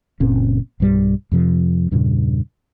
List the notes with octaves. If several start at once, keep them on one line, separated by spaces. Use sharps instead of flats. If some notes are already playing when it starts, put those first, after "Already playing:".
F#1 A#2 C4 C#4
B1 G2 G3
F2 C3 F3
E2 G2 A#2 C#3